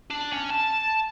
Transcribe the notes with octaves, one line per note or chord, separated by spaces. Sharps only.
D4
C#4
A5